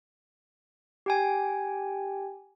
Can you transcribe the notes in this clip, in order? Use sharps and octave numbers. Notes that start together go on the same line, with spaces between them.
G4 G5 G#5